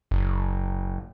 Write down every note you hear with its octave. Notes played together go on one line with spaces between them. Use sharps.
F#1